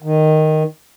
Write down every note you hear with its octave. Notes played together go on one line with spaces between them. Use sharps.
D#3